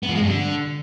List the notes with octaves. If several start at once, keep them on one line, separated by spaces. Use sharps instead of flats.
B3
F3
G#3
G2
D3